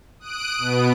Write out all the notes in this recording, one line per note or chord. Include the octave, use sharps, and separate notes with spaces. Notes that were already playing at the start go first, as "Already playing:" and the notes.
D#6 F#6 D7
B2 B3